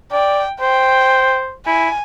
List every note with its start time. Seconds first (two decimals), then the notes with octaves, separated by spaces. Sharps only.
0.12 D5 G5
0.61 C5 G5
1.67 E4 G#5